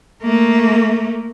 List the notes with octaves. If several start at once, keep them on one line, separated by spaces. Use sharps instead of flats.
A3 A#3